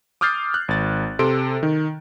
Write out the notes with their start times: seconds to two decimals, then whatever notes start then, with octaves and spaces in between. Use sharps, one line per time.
0.21 D6 D#6 F6 G6 A6 C7
0.54 F#6
0.68 G#1 A6
1.19 C3 A4 C6 D7
1.63 D#3